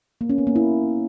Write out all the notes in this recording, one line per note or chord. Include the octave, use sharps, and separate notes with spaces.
A#3
C#4
B3
A#3
E4